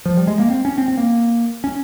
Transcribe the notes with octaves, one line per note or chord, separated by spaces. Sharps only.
F3
G3
G#3
A#3
C4
C#4
C4
C4
A#3
C#4